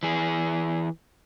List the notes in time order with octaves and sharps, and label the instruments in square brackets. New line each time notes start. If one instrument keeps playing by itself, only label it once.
[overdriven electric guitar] E3 G#4